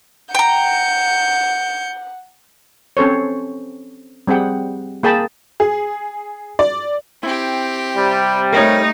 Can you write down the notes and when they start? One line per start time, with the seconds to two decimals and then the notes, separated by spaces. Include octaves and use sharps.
0.35 F#5 G5 A#5 G6 C#7
2.97 C4 C#4 A4 C5 C#5
4.27 G3 C4 G#4 F#5 G5
5.03 A#3 G#4 G5 A5 B5
5.60 G#4
6.59 D5
7.23 C4 E4 G4
7.96 C3 G3
8.52 A3 D#4 A#4 C#5